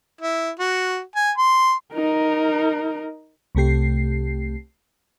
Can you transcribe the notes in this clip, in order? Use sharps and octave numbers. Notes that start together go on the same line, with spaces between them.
E4
F#4
G#5
C6
D#4 A#4
C2 C3 A3 G4 C7